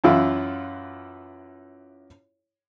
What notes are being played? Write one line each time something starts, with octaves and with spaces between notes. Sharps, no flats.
F#2 E3 E4 F4